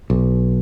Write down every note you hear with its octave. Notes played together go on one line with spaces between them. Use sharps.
B1